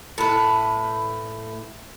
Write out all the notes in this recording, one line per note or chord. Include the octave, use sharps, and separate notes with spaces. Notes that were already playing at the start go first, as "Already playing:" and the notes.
A2 B4